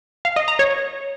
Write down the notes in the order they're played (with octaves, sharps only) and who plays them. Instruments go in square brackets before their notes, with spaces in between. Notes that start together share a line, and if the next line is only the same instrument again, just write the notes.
[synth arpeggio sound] F5
D#5
A#5
C#5